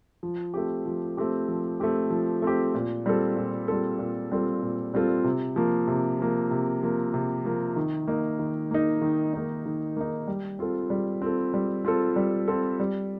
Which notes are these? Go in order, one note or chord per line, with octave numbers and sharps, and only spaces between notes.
F3
A3 C4 G4
F3
A3 C4 G4
F3
A3 C4 G4
F3
A3 C4 G4
A#2
G3 C4 F4 A4
A#2
G3 C4 F4 A4
A#2
G3 C4 F4 A4
A#2
G3 C4 F4 A4
C3
F3 A#3
C3
F3 A#3
C3
F3 A#3
C3
F3 A#3
D#3
A#3 D#4
D#3
A#3 D#4
D#3
A#3 D#4
D#3
A#3 D#4
G3
C4 F4 A4
G3
C4 F4 A4
G3
C4 F4 A4
G3
C4 F4 A4
G3